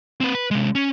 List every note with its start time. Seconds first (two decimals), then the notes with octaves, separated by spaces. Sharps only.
0.20 C4 B4
0.35 B4
0.51 C3 G#3
0.75 C#4